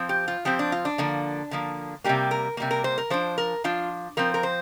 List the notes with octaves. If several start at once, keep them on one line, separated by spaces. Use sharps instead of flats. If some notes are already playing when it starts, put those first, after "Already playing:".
Already playing: F3 C4
G4
F4
F3 C4 G4
D4
F4
D4
D3 F3 A#3
D3 F3 A#3
C3 G3 A#3 G4
A#4
C3 G3 A#3
A#4
C5
A#4
F3 D4 C5
A#4
F3 D4 F4
F3 C4 A#4
A#4
C5